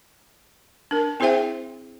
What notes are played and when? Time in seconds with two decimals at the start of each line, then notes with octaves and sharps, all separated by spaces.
0.91 D4 A#4
1.20 C4 E4 G#4 C5 E5 G5